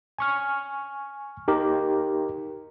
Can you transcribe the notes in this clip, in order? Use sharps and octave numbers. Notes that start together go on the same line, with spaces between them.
G#5 C#6 F6
D#4 G4 A#4